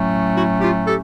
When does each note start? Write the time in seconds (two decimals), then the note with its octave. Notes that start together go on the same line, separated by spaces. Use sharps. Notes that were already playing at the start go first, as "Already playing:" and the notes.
Already playing: A2 F#3 A3 C#4
0.35 E4 F#4
0.61 F4 G4
0.87 G4 A4